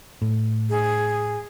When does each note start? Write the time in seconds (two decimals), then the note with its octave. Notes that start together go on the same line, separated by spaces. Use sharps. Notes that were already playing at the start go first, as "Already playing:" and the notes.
0.22 A2
0.70 G#4